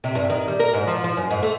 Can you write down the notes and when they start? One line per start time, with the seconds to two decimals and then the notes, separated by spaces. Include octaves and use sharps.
0.04 C3
0.15 G2
0.30 D#3
0.48 G3
0.59 A#4
0.73 G#2
0.87 F3
1.04 F3
1.17 F#2
1.30 G#2
1.43 A3